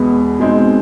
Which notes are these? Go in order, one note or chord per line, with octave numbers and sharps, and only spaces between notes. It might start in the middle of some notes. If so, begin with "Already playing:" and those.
Already playing: E2 B2 G#3 B3
B2 G#3 C4 D#4